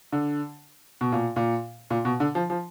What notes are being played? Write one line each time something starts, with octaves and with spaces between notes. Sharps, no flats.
D3
B2
A#2
A#2
A#2
B2
D3
F3
F3